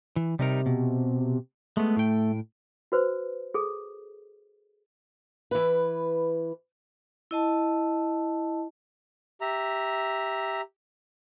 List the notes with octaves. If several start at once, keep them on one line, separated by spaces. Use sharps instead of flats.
E3
C3 G3 D#4 A#4
B2
G#3 A3 B3
A2 G5
F#4 B4 C5
G#4 A4
E3 B4
E4 D#5 A5
G4 E5 A#5